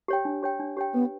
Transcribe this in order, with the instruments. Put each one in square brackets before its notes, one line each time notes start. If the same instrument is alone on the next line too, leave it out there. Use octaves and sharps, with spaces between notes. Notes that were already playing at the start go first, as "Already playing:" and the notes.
[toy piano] G4 C#5 G5
D4
G4 C#5 G5
D4
G4 C#5 G5
[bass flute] B3 [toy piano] B4